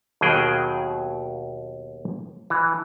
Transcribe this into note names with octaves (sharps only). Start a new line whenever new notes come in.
D#2 B2 D#3 F#3 G#4 G5
E3